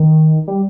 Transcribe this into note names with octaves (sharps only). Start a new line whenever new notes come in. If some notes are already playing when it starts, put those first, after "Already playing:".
Already playing: D#3
G3